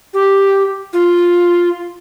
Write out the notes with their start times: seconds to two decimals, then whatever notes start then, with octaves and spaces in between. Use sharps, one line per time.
0.14 G4
0.93 F4